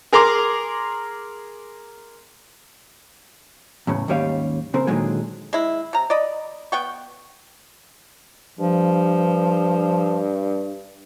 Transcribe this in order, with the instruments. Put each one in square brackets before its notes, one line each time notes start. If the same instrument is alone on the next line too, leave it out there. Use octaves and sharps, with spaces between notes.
[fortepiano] G#4 A#4 A#5 C6 D6
[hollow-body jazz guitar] E2 A2 C#3
D#2 G#2 G3 C#4 G4 F5
C#3 C4 A#4
A#2 D3 D#3 F#3 G#3 G#4
[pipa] G#3 E4
C3 A#5
D5 D#5 B5
B3 G5 C#6
[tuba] G2 [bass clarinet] F3